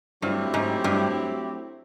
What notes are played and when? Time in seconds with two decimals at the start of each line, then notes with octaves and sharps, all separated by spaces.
0.22 G2 F#3 A3 C4 E4 G4
0.54 G#2
0.84 G2